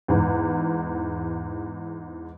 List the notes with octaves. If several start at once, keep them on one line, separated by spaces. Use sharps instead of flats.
E2 G#2